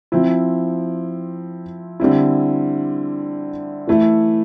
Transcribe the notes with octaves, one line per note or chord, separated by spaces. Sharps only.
F3 C4 E4
D3 G3 C4 E4
E3 A3 E4